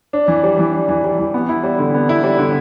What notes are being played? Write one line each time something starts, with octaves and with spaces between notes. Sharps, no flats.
D4
E3
G3
E3
D4
E3
G3
E3
B3
E4
G3
D3
B3
E4
G3
D3